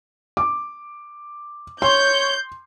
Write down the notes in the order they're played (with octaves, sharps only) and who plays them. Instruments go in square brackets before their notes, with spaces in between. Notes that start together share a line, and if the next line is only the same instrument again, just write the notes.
[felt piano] D6
[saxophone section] C#5 [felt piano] C6 [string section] G6